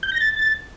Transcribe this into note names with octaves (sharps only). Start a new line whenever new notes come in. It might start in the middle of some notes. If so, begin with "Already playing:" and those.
G6
A#6
A6